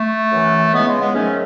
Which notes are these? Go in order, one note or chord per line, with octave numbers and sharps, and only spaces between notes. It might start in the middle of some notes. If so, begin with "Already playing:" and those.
Already playing: A3
F#2 E3
C#2 C#3 E3 G#3 B3
G#3
G#3 B3
G#2 D#3 F#3 A3 C#4